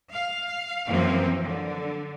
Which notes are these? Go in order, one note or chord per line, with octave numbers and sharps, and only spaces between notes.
F5
F#2 E3 F3 A#3 C4
D3